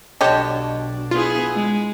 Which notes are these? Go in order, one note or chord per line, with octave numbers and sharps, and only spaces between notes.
B1 D3 D4 G4 C#5 D#5 A5
B3 E4 F4 G#4
G#3